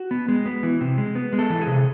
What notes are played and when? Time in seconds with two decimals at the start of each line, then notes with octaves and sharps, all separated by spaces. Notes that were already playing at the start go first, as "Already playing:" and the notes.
Already playing: F#4
0.11 B3
0.28 G#3
0.46 B3
0.63 E3
0.81 C3
0.98 G#3
1.15 B3
1.33 G#3
1.39 A4
1.50 E3
1.61 G#4
1.67 C3